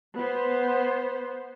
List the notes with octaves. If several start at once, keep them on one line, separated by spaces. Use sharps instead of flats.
B3 C5